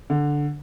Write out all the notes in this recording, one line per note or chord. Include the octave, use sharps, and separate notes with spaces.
D3